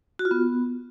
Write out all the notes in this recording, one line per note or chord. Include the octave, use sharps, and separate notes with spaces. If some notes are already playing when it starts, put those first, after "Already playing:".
F#4
F4
B3